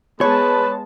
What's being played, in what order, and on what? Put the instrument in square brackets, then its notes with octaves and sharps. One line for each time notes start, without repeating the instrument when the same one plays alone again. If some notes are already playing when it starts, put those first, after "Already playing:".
[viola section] G#3 B3 A5 [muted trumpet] B4 [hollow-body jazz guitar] C#5